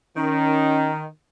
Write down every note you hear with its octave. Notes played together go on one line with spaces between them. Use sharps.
D#3 C#4